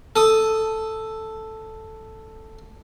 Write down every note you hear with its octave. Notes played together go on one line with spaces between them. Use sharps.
A4 D#6